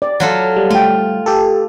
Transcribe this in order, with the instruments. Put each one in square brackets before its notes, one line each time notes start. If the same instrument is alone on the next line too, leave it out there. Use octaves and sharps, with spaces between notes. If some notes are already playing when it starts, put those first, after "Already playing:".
[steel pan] D5
[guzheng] F#3 F4 A4
[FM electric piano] G3
[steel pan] A3 G5 [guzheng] F4
[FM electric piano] G4 A4